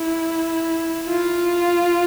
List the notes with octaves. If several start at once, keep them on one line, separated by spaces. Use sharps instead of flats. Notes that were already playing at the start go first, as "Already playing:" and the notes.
Already playing: E4
F4